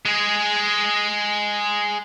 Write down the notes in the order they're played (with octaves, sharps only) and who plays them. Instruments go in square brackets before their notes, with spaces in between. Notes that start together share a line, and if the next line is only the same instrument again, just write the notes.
[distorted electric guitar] G#3 G#4